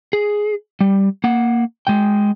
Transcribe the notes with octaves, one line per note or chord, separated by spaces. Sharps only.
G#4
G3
A#3 F#5
G#3 G5